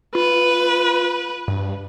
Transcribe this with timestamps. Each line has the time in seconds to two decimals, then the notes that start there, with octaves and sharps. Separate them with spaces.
0.15 F4 B4
1.48 G2